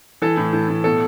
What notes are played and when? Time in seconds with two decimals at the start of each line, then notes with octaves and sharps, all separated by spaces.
0.22 E3 A4
0.37 A2
0.53 A2
0.68 A2
0.84 B2 A4